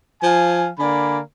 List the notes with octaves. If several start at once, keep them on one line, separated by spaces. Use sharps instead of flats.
F3 F5 G#5
D3 A#3 D5 G#5 B5